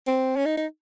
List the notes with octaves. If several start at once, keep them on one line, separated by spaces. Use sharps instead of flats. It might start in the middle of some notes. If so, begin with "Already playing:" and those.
C4
C#4
D#4
D#4